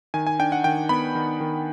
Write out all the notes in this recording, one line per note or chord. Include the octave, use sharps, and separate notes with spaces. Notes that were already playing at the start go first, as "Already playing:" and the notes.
D#3 G#5
G#5
D4 G5
F#5
D#3 G5
B3 B5
D#3
D#3